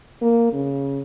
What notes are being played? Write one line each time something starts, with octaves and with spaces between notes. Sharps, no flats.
A#3
C#3